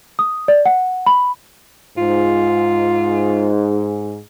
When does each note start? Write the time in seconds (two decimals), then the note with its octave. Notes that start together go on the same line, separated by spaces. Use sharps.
0.19 D#6
0.48 D5
0.66 F#5
1.06 B5
1.97 G#2 F4